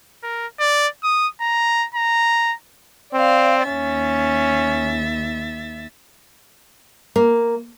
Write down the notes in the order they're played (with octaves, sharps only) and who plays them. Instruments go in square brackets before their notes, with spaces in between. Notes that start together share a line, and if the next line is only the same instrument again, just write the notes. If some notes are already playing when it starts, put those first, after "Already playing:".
[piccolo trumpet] A#4
D5
D#6
A#5
A#5
[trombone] C4 [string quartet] D5 F5
[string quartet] D#2 E5 A6 [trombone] C#4
[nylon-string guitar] A#3